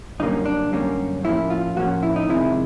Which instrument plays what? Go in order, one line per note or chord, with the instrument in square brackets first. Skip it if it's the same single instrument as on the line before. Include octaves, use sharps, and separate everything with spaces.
[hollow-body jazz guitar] F#2 D3 G3 A#3 C#4 D#4
D4
F#2 D3 G3 A#3 C#4
A2 F3 A#3 C#4 E4
F4
A2 F3 A#3 C#4 F#4
E4
D#4
F2 C3 D#3 G#3 E4